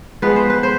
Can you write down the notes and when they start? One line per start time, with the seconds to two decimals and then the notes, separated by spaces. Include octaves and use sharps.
0.22 F3 G#3 B3 B4
0.36 C5
0.50 B4
0.63 C5